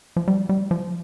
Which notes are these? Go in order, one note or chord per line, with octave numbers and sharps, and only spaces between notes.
F3
G3
G3
F3